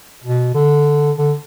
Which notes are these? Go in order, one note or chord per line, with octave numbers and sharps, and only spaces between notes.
B2
D3
D3